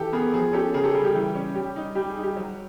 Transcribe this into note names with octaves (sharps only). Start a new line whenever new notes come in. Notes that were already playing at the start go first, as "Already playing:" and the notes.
Already playing: E3 G4 A4
B3 G#4 A#4
F3 G#4
C#4 G4 A4
C#3 G#4 A#4
G4 A4
G3 G#4
G4
E3
C#4
G3 G4
D#4
G3 G4
G#4
D#4
G4
F#3